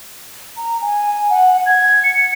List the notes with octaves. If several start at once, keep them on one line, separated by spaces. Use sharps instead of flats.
A#5
G#5
F#5
G#6
C#7